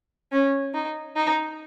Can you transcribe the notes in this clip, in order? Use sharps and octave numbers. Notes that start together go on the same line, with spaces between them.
C#4
D#4
D#4